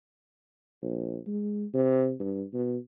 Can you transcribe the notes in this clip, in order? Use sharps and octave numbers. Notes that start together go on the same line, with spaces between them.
A#1
G#3
C3
G2
B2